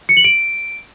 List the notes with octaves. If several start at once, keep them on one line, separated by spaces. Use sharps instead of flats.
C#7
F#7
D7